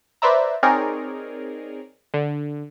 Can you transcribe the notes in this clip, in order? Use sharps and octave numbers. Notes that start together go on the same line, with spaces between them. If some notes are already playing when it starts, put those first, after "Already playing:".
B4 C5 D5 E5 A#5
C4 D#4 G#4 A#4 C#5 D5
D3